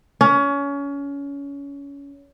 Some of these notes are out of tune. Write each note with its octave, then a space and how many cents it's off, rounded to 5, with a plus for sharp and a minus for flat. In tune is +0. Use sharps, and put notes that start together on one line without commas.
C#4 +25